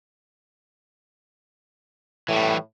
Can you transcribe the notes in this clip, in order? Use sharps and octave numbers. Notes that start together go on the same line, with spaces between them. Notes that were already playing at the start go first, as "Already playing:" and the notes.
A2 E3 G3